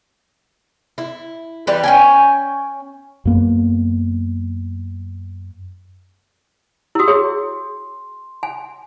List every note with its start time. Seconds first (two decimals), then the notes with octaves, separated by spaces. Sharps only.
0.98 E4
1.67 E3 G3 B4
1.83 C#4 G5 G#5
3.25 F#2 A#3 B3
6.95 E4 F#4 D#6 E6
7.08 G#4 C#5 C6
8.43 G#5